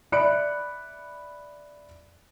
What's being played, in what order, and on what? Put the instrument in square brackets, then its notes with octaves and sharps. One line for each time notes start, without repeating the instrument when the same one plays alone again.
[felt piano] D5 E5 B5 F#6 C#7 D7